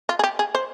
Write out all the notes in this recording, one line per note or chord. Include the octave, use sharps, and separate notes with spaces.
F4
G#4
G4
G#4
C5